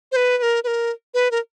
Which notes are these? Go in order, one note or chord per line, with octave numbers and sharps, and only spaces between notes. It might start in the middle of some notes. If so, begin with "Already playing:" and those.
C5
B4
B4
A#4
B4
A#4
B4
A#4